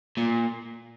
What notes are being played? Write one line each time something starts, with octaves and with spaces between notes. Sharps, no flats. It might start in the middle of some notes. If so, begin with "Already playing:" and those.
A#2